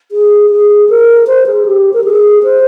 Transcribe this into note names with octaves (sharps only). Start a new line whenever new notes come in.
G#4
G#4
A#4
C5
G#4
G4
A#4
G#4
C5